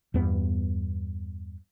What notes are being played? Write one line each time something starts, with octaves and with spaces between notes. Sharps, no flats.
E2 G2 B3